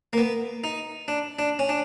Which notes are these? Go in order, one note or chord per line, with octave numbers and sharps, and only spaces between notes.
A#3
B3
D#4
D4
D4
C#4
D4